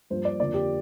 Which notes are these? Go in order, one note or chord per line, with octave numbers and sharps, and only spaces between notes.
G2 F3 A#3 C5
D5
F2 D3 F3 A#3 D5
G4